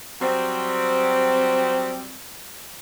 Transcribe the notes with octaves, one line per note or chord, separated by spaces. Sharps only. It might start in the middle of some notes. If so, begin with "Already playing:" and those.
F#3 G3 C4